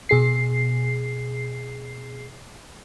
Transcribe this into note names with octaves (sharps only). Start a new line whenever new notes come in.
B2 G#4 C7